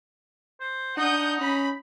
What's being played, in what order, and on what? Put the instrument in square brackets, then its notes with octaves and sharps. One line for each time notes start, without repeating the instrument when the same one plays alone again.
[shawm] C5
[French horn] D4 [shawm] D#4 [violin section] F#5 D#6 G6
[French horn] C#4 [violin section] B5